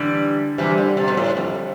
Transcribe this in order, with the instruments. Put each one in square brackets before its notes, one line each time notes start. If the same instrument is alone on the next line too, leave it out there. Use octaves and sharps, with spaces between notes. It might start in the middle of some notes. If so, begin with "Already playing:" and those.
Already playing: [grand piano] D3 [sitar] E3 G3
[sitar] C3 E3 [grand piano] G3
[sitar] D3
C3
B2
A2
F2